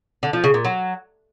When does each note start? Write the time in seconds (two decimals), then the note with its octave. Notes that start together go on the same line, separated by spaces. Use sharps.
0.23 D3
0.33 F3
0.44 C#3
0.54 A#2
0.65 F#3